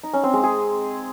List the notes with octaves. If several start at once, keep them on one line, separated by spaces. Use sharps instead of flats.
D#4
C#4
C4
G#3
G#4